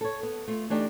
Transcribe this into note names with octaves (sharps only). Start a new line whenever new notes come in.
A4 C#5
B3
A3 F4
E3 A3 D4 D#4 G4